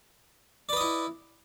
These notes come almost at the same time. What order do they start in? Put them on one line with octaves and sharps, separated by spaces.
D5 B4 D#5 E4